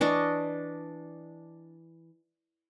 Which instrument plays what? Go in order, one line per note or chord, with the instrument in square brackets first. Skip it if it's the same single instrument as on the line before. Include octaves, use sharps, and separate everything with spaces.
[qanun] E3 D4 D#5 C#6